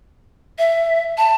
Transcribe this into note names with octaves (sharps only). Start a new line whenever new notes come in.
E5
A5